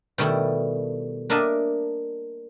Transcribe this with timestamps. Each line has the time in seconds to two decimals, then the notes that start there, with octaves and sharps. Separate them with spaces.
0.18 B2 D#3 G3 A3 E4
1.30 A#3 D4 A#4 D#5 E5 A5